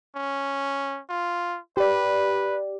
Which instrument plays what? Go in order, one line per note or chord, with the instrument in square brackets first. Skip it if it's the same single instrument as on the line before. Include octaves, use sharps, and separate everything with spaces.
[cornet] C#4
F4
[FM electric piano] G4 D5 [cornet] B4